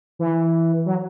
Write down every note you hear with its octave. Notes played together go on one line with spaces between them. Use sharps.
E3
F#3